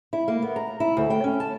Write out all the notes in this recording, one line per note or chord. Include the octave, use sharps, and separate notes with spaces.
E4
A#3
B3
A#5
E4
D2
G5
C#4
A5